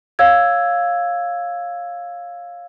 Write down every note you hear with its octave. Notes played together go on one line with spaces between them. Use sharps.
C#5 F5 E6 G#6